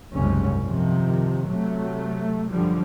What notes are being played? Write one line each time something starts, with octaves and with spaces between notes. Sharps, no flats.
F#1 C2 G#2 C#3 C#4
C3 D#3 F3
C3 F#3 A3
F#2 D3 F3 G3